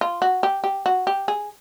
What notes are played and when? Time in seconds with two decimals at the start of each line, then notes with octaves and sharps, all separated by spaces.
0.01 F4
0.22 F#4
0.43 G4
0.64 G4
0.86 F#4
1.07 G4
1.28 G#4